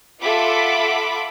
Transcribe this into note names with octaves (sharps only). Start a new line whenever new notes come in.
F4 A4 E5 F#5 B5 D6